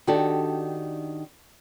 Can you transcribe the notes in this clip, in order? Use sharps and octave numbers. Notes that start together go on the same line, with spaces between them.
D#3 D4 F#4 G4 A4